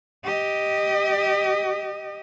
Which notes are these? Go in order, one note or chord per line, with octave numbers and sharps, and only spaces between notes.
G4 D#5